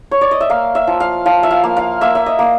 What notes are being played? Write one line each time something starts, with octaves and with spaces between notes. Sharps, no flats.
C#5
D5
D#5
E5
A#3 F5
E5
F3
F5
F3 F5
E5
F5
A#3
F5
A#3 E5
E5
D#5
A#3